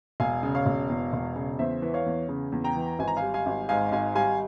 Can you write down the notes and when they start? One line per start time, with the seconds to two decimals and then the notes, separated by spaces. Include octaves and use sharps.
0.20 E1 F5 G#5
0.43 C#3
0.55 C#5 F5
0.66 E1
0.90 E2
1.13 E1
1.36 C#3
1.59 E2 C5 E5
1.82 E3
1.94 C#5 F5
2.06 E2
2.29 C#3
2.52 E2
2.64 G5 A#5
2.76 E3
2.99 G#1 G#5
3.08 A#5
3.17 F5 G#5
3.22 G3
3.34 F5 G#5
3.46 G#1
3.69 G#2 F5 G#5
3.92 G#1 F5 G#5
4.15 G3 F5 G#5